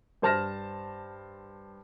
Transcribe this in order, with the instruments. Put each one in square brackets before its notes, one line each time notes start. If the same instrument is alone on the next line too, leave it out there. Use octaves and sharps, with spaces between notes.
[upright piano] G2 C5 A5 F6 A#6 E7